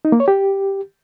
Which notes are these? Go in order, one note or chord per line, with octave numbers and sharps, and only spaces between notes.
D#4
A#3
C#5
G4